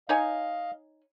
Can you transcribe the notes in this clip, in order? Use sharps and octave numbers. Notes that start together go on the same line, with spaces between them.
D#4 C#5 D#5 F5 G#5